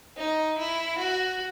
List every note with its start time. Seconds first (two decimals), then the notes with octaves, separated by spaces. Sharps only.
0.17 D#4
0.58 E4
0.98 F#4